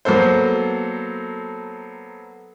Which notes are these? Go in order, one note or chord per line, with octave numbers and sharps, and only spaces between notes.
F#3 A#3 B3 A4 C5